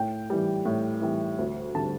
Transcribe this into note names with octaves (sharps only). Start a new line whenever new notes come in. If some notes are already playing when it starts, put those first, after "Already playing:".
Already playing: A2 G5
E3 G3
A2
E3 G3
D2
D3 G3 A5